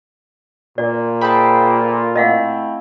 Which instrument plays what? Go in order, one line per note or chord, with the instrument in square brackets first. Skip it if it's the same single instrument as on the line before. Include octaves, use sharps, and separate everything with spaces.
[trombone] A#2 [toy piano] D5
[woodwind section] G#4 C5 G5 [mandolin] A4 E5 B5
[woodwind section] F4
[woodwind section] A3 C4 E4 [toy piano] D#5 F5 F#5